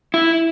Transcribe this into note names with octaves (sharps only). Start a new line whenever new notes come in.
E4